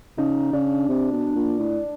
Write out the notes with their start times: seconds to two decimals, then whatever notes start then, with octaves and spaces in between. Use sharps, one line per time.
0.18 C#3 D#4
0.53 C#3 D4
0.88 C3
1.12 B2
1.36 A#2
1.59 A2